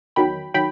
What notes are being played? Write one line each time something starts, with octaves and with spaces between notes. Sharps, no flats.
E2 D#3 F#3 G5 B5
D#3 F#3 G5 B5